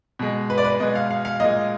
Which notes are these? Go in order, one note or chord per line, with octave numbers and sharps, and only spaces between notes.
B2 G#3
B4
D5
B4
B2 G#3 D#5
F5
F5
F5
A#2 G#3 D#5